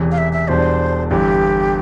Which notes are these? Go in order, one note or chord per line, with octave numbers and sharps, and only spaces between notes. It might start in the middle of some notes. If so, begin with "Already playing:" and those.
Already playing: E1 E2 C3 E3
F5
E5
E5
E1 E2 B2 G3 D4 C5
G1 G2 E3 G4